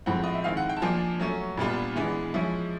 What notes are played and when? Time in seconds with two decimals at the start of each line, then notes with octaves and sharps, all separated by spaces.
0.06 A2 F3 G#3 C4 F#5
0.24 D#5
0.34 E5
0.44 D#3 G#3 C4 E4 F5
0.57 F#5
0.69 G5
0.77 A5
0.82 F3 A#3 D4 F4 G#5
1.20 F#3 A3 C#4
1.58 A#2 G3 B3 D4 F4
1.96 E3 G#3 B3 D4
2.34 F3 G#3 C#4 E4